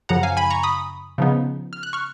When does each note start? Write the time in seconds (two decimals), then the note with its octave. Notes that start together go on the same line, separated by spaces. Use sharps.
0.09 F#2 C#3 F3 F#5 A#5
0.23 F5 G#5
0.37 G#5 B5
0.50 A#5 C#6
0.63 B5 D#6
1.18 C#3 F3 B3 D#4
1.73 F6
1.83 F#6
1.93 C#6 F6